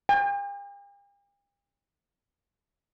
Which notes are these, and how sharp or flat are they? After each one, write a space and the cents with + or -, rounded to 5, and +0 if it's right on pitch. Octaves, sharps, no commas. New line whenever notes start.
G5 +45